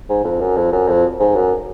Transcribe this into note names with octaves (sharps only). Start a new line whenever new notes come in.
G#2
F2
F#2
F2
F#2
F2
G#2
F#2